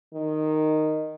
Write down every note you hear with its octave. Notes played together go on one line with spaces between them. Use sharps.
D#3